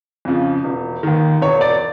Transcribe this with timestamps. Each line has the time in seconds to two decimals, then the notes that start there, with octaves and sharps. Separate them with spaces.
0.25 F2 C#3 F3
0.64 E1
1.03 D#2 D#3
1.42 E1 C#5
1.61 D5